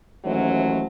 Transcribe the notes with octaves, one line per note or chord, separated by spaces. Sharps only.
D#2 E3 F#3 A3 C#4 C5